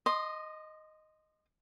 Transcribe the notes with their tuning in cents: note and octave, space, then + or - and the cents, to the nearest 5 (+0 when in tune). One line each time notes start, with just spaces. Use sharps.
D#5 +0 C6 +0 D#6 -45